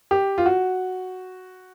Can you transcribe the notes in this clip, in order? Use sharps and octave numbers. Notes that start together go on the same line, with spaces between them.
G4
F4
F#4